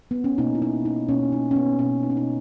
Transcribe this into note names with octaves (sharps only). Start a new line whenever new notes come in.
B3
C#4
B2 A#3 D#4
E4
D#4
D#4
B2 A#3 C#4
D#4
C#4
B3
B2 A#3 C#4
D#4
C#4
D#4